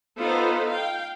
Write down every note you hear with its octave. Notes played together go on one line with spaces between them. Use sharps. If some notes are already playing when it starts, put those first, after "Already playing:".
B3 D#4 F4 A4 B4 C5
F5 G5